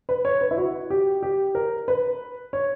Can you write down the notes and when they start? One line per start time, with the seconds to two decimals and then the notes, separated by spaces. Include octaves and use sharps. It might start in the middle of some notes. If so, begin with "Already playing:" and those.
0.09 B4
0.25 C#5
0.41 B4
0.51 E4
0.58 F#4
0.90 G4
1.23 G4
1.55 A#4
1.88 B4
2.53 C#5